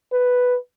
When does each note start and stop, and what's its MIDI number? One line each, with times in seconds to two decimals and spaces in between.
0.13 0.56 71